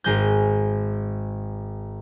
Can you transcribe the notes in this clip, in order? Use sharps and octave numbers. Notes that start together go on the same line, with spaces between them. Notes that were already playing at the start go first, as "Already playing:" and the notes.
G#1 G#3 G6